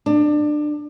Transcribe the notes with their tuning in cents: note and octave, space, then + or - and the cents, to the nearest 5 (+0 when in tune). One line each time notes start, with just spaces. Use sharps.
D4 +25